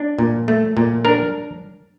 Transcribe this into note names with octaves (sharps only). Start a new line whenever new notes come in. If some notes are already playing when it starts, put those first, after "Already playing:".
Already playing: D4
A#2
A3
A#2
D4 A#4